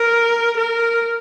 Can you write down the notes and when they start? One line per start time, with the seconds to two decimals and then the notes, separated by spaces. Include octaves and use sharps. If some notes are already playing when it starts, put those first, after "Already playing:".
Already playing: A#4
0.57 A#4